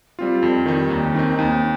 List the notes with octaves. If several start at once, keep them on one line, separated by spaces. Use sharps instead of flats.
G3 C4 F4
F2
D#3 G3 D#4
D#2
D#3 C4 D#4
D#2